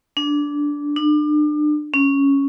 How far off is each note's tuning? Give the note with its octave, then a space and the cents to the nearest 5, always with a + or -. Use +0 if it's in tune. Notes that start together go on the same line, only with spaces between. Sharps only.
D4 -10
D4 +35
C#4 +0